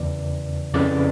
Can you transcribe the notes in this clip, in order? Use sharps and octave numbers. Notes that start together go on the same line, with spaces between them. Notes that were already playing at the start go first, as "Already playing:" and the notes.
Already playing: E2 C#3 E3 D5
F2 C#3 E3 D5